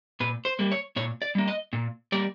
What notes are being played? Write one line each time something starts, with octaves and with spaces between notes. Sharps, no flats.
A#2 B4
C5
G3 A#3
C#5
A#2 C#5
D5
G3 A#3
D#5
A#2
G3 A#3 D5